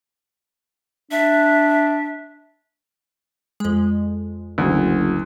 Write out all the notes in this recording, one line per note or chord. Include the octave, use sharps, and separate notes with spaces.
D4 E5
F2 G#3
F#1 D2